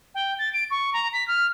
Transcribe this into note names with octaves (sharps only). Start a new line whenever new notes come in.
G5
A6
D7
C#6
A#5
B6
F6